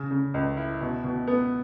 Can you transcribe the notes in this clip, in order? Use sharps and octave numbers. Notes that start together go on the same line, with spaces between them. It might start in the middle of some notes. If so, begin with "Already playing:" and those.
Already playing: C#3
C#3
C#2
E4
B2
B2
B3